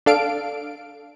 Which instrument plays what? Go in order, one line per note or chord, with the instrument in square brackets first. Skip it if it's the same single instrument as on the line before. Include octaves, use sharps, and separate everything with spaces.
[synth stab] D4 A4 F5 D7